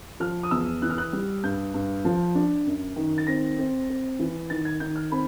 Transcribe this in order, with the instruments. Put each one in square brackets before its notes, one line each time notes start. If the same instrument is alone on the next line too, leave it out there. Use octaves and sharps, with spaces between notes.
[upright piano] F3 F6
D#6
E2 E6
E3 F#6
F6
F#6
G3
G2 G6
G2
F3
D4
F#2
D#3
A6
C4 A#6
C4
C4
E3
D#3 A6
G#6
D#3 G6
F6
C4 B5